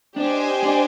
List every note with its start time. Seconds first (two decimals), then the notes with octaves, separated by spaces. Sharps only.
0.16 D4 G4 C5 D#5 G#5
0.63 D4